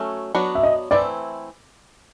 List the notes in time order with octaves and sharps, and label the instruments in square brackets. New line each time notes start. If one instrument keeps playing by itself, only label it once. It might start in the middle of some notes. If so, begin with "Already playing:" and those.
Already playing: [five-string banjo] F#3 A3 C#4
F#3 B3 D4 F#4
[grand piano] E5
D#5
[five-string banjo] E3 A3 C4 E4 [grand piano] D5